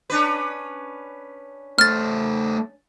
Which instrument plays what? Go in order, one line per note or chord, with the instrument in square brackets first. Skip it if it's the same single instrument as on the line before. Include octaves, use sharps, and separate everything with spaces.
[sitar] C#4 D4 B4
[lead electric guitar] A3 C5 [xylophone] F6 A6